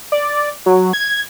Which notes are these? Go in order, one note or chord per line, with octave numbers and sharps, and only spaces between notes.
D5
F#3
G#6